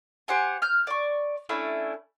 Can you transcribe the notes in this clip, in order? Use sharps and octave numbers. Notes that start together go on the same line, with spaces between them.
G4 C5 F#5 G#5
F6 G6
D5 C#6
A3 C#4 D4 E4